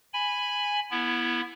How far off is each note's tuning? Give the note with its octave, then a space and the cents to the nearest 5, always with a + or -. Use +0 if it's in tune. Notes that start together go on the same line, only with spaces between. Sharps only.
G#5 -5 B5 +5
B3 -20 E4 +10